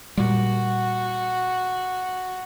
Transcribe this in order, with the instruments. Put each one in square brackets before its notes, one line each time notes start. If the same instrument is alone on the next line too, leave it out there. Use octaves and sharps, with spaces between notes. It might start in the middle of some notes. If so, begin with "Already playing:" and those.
[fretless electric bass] A#2 G3 [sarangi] F#4